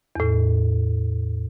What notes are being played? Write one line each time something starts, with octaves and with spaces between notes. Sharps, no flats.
E2 A2